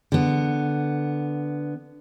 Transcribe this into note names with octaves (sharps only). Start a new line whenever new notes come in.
D3 B3